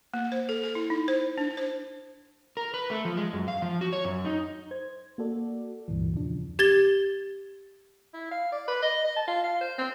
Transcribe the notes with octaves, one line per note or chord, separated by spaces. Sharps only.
A#3
C5
A4
A4
E4
D#4
C5
D4
C5
A#4
B4
A3
F3
G#3
F#2
F5
F3
F#4
C#5
F#2
D#4
C5 G#6
A#3 F#4 A4 D5
C#2 G2 A#2 E3
E2 C#3 F3 D4
G4 G#6 A6 G7
E4
F5
D5
B4
D#5
D#5
A5
F4
F5
C5
C4